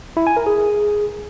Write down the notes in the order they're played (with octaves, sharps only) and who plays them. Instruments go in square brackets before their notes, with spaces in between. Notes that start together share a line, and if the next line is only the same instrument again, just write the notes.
[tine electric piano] E4
G#5
A#4
G#4